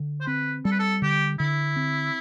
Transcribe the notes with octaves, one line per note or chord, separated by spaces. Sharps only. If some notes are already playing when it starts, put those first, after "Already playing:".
Already playing: D3
C5
C4 B4
G3 A4
B4
A4
D3 G4
D3 E4
C4